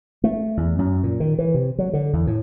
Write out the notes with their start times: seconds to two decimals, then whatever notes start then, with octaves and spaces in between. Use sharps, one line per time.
0.24 A3
0.57 E2
0.79 F#2
1.03 A#2
1.20 D#3
1.39 E3
1.54 C3
1.79 F#3
1.93 D3
2.13 E2
2.27 A2